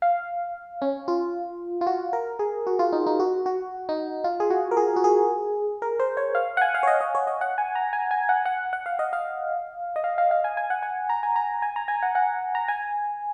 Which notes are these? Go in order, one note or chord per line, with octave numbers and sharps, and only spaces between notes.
F5
C#4
F4
F4
F#4
A#4
G#4
F#4
F4
D#4
D#4
F#4
F#4
D#4
F4
G#4
F#4
A#4
G#4
F#4
G#4
A#4
C5
C#5
F5
F#5
G#5
F5
C#5
D#5
D#5
C#5
D#5
F#5
G#5
A#5
G#5
G#5
F#5
F#5
F#5
F5
D#5
F5
D#5
F5
F5
F5
G#5
G#5
F#5
G#5
A#5
G#5
A#5
G#5
A#5
G#5
F#5
F#5
A#5
G#5